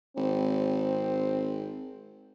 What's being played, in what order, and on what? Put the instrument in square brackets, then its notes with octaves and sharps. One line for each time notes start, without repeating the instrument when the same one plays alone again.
[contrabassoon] G#1 [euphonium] C4